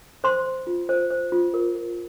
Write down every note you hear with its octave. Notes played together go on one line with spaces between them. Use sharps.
C5 C6
C5
F4
C5
C5
F4
A#4
A#4